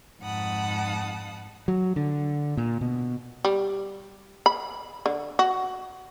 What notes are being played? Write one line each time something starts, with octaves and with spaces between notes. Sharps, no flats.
F2 G#2 F#5 A5 B5 D#6
F#3
D3
A#2
B2
G3
B5
D3
F#4